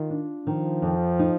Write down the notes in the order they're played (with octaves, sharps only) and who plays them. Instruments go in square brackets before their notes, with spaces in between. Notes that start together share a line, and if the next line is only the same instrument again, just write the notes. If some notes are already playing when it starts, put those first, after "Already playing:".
Already playing: [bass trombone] D#3 [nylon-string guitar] F4
[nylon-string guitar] D4
[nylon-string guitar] D#3 [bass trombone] F3
[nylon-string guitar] F2
D#4